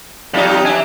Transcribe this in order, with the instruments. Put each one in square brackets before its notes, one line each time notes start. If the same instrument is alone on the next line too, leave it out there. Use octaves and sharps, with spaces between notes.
[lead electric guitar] F2 [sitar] F#3 D#4 G4
[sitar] D4 [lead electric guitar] E5 G#5